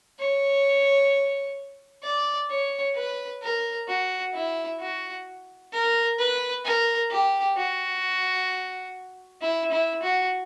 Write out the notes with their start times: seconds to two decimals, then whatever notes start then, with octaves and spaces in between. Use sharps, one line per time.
0.19 C#5
2.04 D5
2.50 C#5
2.96 B4
3.42 A#4
3.88 F#4
4.34 E4
4.80 F#4
5.73 A#4
6.19 B4
6.65 A#4
7.11 G4
7.57 F#4
9.41 E4
9.72 E4
10.03 F#4